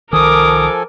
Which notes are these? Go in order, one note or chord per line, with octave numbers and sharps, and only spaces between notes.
C2 D#3 F3 A4 A#4 G#5 D6 D#6